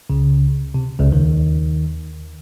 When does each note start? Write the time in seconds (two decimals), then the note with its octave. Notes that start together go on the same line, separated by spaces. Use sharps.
0.10 C#2 C#3
0.74 C3
0.99 C#2 C#3
1.12 D#2 D#3